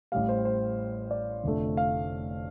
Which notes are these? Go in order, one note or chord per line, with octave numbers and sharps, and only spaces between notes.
A1 A2 G3 F5
C5
C5
D5
F1 F2 D3 A3
F5